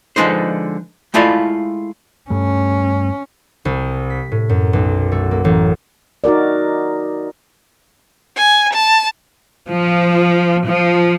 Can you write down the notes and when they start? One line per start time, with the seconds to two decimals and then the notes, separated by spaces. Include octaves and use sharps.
0.16 D3 F3 G#3 D#4 B4 C5
1.14 G#3 A3 E4 F4 D5 F5
2.30 G2 G3 A3 C#4
3.65 C2
4.10 B6
4.31 A2
4.49 F#2
4.73 B1
5.12 A3
5.31 A#3
5.45 A1
6.24 D#4 F#4 A#4 D5
8.37 G#5
8.73 A5
9.69 F3
10.67 F3